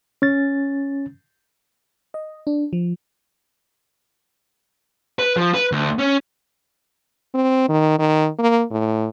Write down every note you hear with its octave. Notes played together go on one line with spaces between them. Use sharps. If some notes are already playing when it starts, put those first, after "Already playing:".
C#4 A6
D#5
D4
F3
B4
F3
B4
D2
C#4
C4
D#3
D#3
A#3
A2